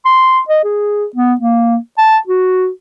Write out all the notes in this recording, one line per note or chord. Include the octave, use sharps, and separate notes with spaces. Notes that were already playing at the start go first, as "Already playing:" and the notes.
C6
D#5
G#4
B3
A#3
A5
F#4